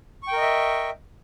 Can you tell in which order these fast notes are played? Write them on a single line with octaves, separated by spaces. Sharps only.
C#6 G5 A#4 D#5 E5